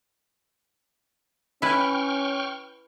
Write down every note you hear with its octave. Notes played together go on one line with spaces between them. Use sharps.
C#4 E4 B4 G5 C#6 F6